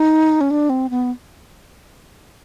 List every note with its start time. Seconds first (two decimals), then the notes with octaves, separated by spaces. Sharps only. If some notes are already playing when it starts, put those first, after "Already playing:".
Already playing: D#4
0.41 C#4
0.51 D4
0.70 C4
0.90 B3